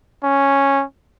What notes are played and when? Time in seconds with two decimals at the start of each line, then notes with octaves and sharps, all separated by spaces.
0.23 C#4